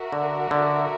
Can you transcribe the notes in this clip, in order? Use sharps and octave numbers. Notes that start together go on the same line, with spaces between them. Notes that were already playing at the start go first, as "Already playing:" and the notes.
Already playing: F#4 A#4 E5
D3
D3